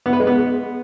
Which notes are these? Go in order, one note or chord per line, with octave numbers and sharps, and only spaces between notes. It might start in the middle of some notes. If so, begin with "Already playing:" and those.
B3
B4
G#3
B3